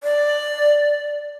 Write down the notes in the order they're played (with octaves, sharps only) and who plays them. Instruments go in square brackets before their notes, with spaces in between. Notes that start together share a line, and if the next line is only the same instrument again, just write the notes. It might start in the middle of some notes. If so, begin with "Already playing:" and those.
[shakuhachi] D5